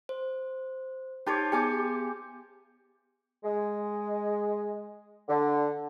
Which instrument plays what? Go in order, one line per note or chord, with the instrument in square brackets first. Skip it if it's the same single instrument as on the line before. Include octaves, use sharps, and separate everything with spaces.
[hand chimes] C5
[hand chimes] D#4 A5 A6 [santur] G4 C5 C#5
[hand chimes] B3 G#4 C#7 [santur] G4 G#5 D6
[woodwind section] G#3
D3